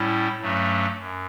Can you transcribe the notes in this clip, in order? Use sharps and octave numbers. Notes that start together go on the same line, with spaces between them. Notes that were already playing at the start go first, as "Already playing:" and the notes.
Already playing: A2 G3 C#4 E4
G2 F#3 A3 C#4
F#2